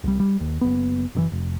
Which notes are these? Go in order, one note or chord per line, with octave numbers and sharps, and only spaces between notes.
C2 G3
G3
D#2
F#1 B3
F#1 A#2 E3
F1